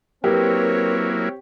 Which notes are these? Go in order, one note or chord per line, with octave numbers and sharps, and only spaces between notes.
F#3 A#3 C4 E4 G4 A#4 B4 C#5